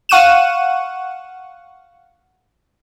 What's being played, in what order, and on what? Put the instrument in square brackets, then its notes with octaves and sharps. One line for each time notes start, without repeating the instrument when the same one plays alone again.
[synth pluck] F5 F#5 C#6 F#6 D#7 E7